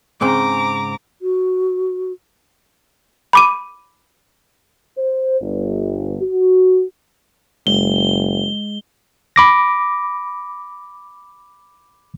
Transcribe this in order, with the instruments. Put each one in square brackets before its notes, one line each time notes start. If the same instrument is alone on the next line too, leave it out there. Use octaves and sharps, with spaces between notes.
[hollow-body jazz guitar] G#2 C#3 C4 [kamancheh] A#5 D6
[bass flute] F#4
[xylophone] B5 D6 D#7
[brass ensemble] C5
G1
F#4
[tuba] F#1 [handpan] G#3 [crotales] G7
[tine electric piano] B5 D6 A#6